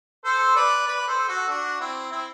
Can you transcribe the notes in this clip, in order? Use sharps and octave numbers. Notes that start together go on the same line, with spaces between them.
A4 C5
B4 D5
B4 D5
A4 C5
F#4 A4
D4 F#4
C4 E4
C4 E4